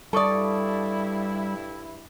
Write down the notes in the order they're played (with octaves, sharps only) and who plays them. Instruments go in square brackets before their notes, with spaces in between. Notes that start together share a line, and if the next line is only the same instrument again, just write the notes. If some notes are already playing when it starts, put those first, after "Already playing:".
[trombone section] G2 E4 [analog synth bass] G3 [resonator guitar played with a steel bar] A4 D5 [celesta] A5 C#6 D#6